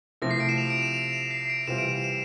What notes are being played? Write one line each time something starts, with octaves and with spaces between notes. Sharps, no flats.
C3 F3 A3 C4 E4 A#6
C7
D7
E7
F7
D7
E7
F7
E7
C7
D7
C3 E3 G3 C4 F4 E7
D7
E7
E7